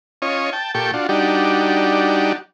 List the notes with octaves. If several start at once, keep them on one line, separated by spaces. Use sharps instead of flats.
C#4 F4 C#5 D#5
G5 A5
A#2 G4 A4 G5 C#6
D4 F4 F#4
G3 D4 D#4 F#4 G4